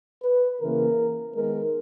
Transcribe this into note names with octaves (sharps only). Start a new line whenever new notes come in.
B4
C#3 E3 A#3 A#4
D#3 G#3 B3 A#4